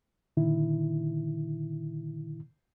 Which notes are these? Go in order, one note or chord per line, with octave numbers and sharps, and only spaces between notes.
A#2 D3 D#3 E4